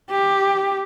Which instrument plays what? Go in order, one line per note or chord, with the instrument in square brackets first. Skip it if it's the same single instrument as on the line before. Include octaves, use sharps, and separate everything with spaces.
[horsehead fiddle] G4